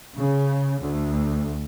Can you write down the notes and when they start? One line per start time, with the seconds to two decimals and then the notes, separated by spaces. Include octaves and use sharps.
0.15 C#3
0.81 D2